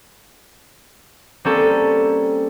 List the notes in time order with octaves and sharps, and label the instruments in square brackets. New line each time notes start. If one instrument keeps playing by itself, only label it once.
[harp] G3 A#3 C4 C#4 A4